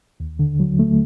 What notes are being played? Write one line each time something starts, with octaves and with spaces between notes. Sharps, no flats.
D#2
D3
F#3
A3